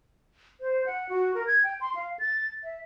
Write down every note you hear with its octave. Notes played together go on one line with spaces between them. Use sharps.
C5
F#5
F#4
A#4
G#6
G5
C6
F5
A6
E5